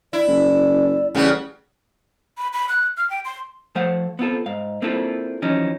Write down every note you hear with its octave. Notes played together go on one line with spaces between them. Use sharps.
E4 D5
F#1
A1 C#3 G3 B3
B5
B5
F#6
F6
G5
C6
F3 A3 C5 F5 F#5
B3 C4 F4 A4
G#2 F5
A#3 C4 D4 E4 F4 A4
F#2 E3 F3 C#4 D#4